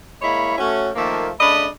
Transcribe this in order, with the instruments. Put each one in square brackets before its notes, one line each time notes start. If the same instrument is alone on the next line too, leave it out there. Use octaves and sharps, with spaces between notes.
[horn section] G#3 A#3 E4 C#5 D#5 B5
A3 C#4 F#4
D#3 F3 A3 A#3
C#3 A3 D4 D#5 B5